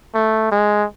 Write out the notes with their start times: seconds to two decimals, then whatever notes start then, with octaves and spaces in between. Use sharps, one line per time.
0.15 A3
0.52 G#3